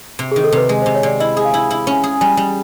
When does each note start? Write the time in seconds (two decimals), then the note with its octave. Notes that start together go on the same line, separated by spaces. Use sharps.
0.19 C3
0.32 D#3 G#4
0.44 A4
0.52 C3 B4
0.69 G#3
0.82 C3 C5
0.95 C#5
1.03 C3 D5
1.20 E4 D#5
1.37 G#4
1.45 F5
1.54 E4
1.71 E4
1.87 C#4
2.04 G#4
2.21 G3 G#5
2.37 G3